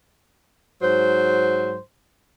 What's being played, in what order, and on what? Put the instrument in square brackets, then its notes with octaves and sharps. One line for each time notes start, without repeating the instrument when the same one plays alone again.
[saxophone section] G#2 F#3 C5